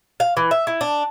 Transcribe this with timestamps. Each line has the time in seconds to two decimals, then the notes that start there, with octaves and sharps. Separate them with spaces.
0.20 F5
0.37 E3
0.51 E5
0.67 E4
0.81 D4